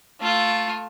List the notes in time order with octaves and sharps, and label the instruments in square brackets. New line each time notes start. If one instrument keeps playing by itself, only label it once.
[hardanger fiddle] A3 F4